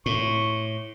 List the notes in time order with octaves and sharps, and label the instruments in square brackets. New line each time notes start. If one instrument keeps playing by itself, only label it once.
[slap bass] A2 [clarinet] C#6